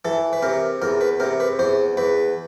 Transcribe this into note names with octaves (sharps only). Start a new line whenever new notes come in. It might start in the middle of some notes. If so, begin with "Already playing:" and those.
E3 A4
B4
C3 A#4
E2 A#4
B4
C3 A#4
B4
E2 C5
E2 B4